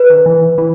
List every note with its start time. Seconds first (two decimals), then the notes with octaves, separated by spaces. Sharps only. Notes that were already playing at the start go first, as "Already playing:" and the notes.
Already playing: B4
0.10 D#3
0.26 E3
0.58 E3